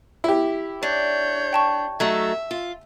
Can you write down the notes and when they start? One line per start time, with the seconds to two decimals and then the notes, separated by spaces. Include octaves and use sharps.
0.24 E4 G4
0.83 D4 C#5 G6
1.53 G5 A5 C#6
2.00 F#3 A3 D#4 E5
2.51 F4